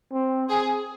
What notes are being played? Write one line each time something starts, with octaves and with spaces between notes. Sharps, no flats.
C4
G#4